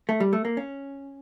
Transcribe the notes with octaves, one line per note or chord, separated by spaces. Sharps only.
A3
G3
A3
A#3
C#4